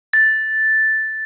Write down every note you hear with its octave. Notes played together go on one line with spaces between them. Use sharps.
A6